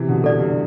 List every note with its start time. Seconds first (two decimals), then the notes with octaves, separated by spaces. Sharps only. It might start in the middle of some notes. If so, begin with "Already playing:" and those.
Already playing: C3 E3
0.09 B2 D3
0.24 G2 B2 A4 D5
0.39 G2